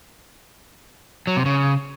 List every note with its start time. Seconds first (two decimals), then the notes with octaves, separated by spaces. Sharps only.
1.27 F#3
1.36 C3
1.46 C#3